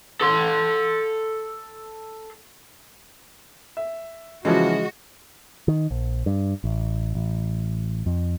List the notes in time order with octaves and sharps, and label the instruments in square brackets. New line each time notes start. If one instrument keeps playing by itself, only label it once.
[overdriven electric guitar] A4 C6
[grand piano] E5
[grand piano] C#3 E3 F3 [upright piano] G#3 [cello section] F#4
[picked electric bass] D#3
A#1
G2
A1
A1
F2